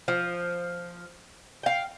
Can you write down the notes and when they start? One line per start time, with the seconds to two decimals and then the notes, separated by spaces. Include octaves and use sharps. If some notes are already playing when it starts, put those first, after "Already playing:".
0.08 F3
1.63 F5 G5